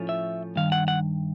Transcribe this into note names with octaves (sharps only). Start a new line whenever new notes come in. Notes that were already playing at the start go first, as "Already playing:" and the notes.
Already playing: A2 F3 A3 C#4
E5
G2 D#3 F5
F#5
F#5